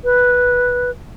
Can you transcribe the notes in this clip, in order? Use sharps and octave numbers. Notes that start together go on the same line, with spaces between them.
B4